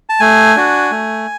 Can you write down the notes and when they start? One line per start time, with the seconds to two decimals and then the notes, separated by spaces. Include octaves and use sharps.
0.09 A5
0.20 A3 G#5
0.56 D4 F#4
0.91 A3